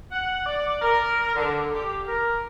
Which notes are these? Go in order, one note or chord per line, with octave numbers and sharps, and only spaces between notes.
F#5
D5
A#4
D3
G4
A#4